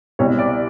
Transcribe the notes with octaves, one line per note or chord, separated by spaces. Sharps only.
C2 B2 C#5
D5